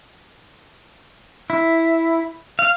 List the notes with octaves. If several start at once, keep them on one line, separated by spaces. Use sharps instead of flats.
E4
F5